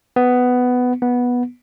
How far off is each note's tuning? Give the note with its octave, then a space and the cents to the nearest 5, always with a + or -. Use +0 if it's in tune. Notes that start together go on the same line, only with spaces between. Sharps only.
B3 +10
B3 -10